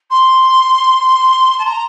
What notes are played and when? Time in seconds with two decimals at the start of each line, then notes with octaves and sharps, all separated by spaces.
0.10 C6
1.58 A5
1.65 A#5